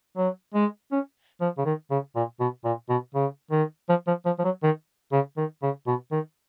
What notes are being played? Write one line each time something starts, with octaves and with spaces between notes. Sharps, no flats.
F#3
G#3
C#4
F3
C#3
D#3
C#3
A#2
B2
A#2
B2
C#3
D#3
F3
F3
F3
F3
F#3
D#3
C#3
D#3
C#3
B2
D#3